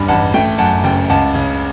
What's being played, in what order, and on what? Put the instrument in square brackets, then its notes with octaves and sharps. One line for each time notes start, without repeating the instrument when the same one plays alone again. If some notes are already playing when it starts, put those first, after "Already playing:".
Already playing: [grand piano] F#1 E2 G2 G3 B5
A1 F#5 A5
A3 G5
F#2 F#5 A5
F#1 G5
C#2 F#5 A5
C#3